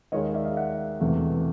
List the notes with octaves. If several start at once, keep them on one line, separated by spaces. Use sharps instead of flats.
D#2 D#3 G#3 C#5 D#5
D5 E5
D#5 F5
E5 F#5
E1 E2 C3 E3 A3